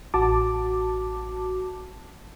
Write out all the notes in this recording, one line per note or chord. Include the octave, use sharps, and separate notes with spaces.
A1 F#4 A5 D6